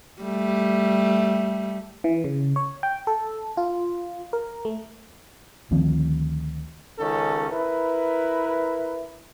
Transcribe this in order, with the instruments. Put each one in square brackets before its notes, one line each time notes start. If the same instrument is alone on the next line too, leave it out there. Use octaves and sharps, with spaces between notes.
[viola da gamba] G3 A3
[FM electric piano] E3
C#3
C#5
G5
A4
F4
A#4
A3
[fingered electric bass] D2 D#3 F3 C4
[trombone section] C#2 D#3 C#4 A4
E4 A#4 B4